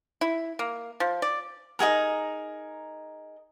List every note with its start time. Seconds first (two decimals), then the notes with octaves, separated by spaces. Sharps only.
0.21 E4
0.59 A#3
1.00 F3
1.22 D5
1.79 D#4 F#4 G#4 A#4